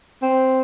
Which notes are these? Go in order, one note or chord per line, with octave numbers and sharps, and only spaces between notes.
C4